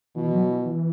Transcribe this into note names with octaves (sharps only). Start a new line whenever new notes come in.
B2 E3
F#3
E3
E3